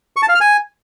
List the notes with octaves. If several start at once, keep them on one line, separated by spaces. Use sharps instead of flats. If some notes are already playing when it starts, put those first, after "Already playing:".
C#6
A5
F5
F6
G#5